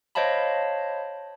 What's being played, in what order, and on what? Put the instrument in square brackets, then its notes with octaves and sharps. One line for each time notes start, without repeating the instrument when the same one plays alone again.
[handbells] C5 C#5 D#5 F5 A5 B5